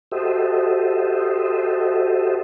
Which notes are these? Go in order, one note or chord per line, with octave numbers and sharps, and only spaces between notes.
F#4 G4 A4 C5 D#5 E5